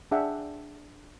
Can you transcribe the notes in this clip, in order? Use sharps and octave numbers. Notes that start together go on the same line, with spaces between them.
D4 G#4 E5 F#5 G5